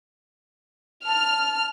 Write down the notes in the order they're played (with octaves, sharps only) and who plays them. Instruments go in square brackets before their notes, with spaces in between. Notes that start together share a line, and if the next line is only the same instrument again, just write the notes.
[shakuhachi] A5 [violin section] F6